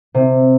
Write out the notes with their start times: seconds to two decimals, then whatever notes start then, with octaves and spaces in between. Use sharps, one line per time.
0.14 C3